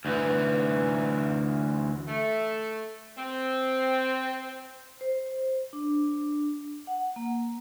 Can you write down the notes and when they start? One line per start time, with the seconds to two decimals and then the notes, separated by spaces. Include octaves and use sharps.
0.05 D2 E3
2.08 A3
3.18 C4
5.01 C5
5.73 D4
6.87 F#5
7.16 A#3